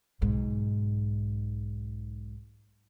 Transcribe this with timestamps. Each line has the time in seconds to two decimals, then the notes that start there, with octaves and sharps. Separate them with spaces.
0.22 B1 G#2